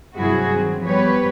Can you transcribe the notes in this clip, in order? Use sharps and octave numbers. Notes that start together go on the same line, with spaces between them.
G2 C3 F#3 E4 F#4 G#4
D#3 C4
F3 G3 B3 G4 B4 C#5